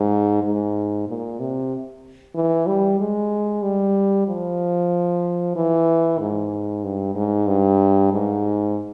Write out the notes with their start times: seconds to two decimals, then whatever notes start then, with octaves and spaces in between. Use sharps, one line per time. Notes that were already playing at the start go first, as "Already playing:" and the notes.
Already playing: G#2
0.43 G#2
1.07 A#2
1.40 C3
2.35 E3
2.67 G3
3.00 G#3
3.63 G3
4.28 F3
5.56 E3
6.19 G#2
6.84 G2
7.15 G#2
7.47 G2
8.12 G#2